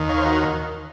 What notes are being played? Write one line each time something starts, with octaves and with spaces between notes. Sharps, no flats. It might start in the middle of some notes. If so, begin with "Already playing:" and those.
Already playing: D#2 D#3
C#5 F5
C5
F#4 A#4